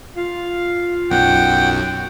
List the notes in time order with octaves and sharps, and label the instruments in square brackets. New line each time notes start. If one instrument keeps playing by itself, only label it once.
[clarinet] F4 [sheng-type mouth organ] F5
[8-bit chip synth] B1 F#2 [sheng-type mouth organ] F#5 G5